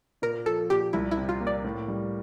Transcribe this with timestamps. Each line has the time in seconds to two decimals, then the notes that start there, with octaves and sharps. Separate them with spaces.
0.22 A#2 A#4
0.46 F3 A4
0.70 A#2 G4
0.93 C2 E4
1.11 E4
1.17 C3
1.29 F4
1.40 A#3
1.47 D5
1.64 A2
1.88 G3